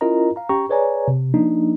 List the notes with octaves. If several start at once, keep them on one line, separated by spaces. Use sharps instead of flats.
C#4 E4 F4 A#4 D#5 A#5
F5 A#5
C#4 G4 G5 A#5 C#6
G#4 B4 C#5 D5 G#5 A#5
C3
F3 A#3 D4 D#4